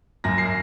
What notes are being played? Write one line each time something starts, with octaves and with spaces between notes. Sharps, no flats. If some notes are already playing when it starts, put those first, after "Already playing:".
F#2 A#6
C7